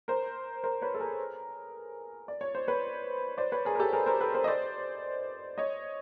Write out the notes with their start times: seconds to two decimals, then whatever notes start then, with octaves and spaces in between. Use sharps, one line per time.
0.08 A#4 C5
0.64 A#4 C5
0.82 B4 C#5
0.95 A4
1.00 G#4 A#4
2.28 D5
2.41 C#5
2.55 C5
2.67 B4 C#5
3.38 C5 D5
3.52 B4 C#5
3.65 G#4 A#4
3.75 A#4
3.80 G4 A4
3.93 G#4 A#4
4.06 A#4 C5
4.21 A4 B4
4.34 A#4 C5
4.44 D#5
4.48 C5 D5
5.58 C#5 D#5